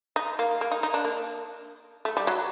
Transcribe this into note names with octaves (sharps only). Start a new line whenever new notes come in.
D#4
A#3
A#3
D#4
D#4
D4
A#3
A3
G3
F#3